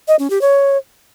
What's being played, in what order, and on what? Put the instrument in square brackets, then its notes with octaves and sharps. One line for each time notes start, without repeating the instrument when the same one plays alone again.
[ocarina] D#5
C#4
G4
C#5